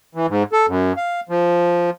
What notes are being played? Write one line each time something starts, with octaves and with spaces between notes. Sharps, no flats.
E3
G#2
A4
F#2
F5
F3